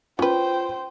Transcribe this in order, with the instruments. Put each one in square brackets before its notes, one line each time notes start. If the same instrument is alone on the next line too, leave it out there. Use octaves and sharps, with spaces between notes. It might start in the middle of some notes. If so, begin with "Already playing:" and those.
[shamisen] C#4 B4 [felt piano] F4 [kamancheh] C5 G5